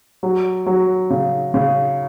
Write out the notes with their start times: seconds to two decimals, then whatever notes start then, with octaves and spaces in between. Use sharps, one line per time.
0.23 F#3
0.66 F#3
1.10 C#3
1.54 C#3